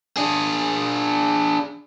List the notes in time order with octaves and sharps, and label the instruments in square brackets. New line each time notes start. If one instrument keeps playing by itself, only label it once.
[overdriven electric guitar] D4 G#4